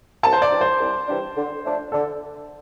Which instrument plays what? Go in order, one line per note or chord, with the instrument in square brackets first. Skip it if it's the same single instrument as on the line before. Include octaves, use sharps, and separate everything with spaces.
[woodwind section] C2 [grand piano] A5
[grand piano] C5
D5
[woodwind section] C3 E3 G3 D4
[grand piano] C5
[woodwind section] C2
C3 E3 G3 D4
D3
F3 A3 D4
[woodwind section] D3 [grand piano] A4